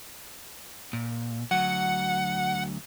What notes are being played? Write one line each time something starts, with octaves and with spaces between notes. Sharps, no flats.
A#2
D2 F#3 F#5